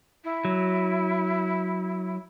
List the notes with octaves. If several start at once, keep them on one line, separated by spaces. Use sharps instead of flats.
E4
F#3